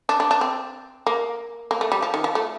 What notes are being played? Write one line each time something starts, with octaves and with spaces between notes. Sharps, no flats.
D4
D4
D4
C4
A#3
A#3
A3
G3
F3
D#3
F3
A3